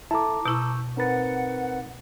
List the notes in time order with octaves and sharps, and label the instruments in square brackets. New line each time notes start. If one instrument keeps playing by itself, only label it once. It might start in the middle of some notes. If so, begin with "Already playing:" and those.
[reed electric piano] E4 A4 [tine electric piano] A5 A#5 D6
[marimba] B2 E4 [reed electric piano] C#6 E6 G6
[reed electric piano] C4 A#4 B4 [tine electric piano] D#4 A6 [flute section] F#5